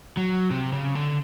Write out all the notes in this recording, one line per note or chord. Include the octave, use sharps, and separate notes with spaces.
F#3
C3
C#3
D3